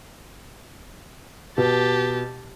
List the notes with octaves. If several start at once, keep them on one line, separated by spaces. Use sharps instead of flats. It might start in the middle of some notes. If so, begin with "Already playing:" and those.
B2 G4 A5